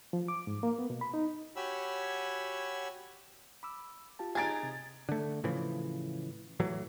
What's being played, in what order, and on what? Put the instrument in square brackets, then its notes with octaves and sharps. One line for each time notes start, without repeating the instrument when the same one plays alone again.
[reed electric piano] F3
D6
G#2
A#3
B3
B2
B5
D#4
[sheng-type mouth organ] F#4 G4 C#5 G#5 B5 E6
[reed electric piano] B5 D6 E6
F4 G4 A5
[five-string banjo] D#4 G#4 [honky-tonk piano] G#6 A6 D7
[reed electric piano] C3
[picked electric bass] D3 A3
A2 C#3 E3 F3
A2 E3 F#3